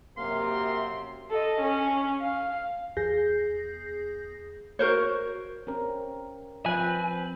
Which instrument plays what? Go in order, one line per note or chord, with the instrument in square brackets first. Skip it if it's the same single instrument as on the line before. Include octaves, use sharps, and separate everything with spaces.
[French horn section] F#2 C3 [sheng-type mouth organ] A#3 F5 [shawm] C6
[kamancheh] A4 D#5
C#4
F5
[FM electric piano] E2 G#4 G6 A#6 C7
[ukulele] F#4 A#4 C5 C#5
[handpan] C4 C#4 A#4
[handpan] F3 [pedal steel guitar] C4 B4 [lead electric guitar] G#5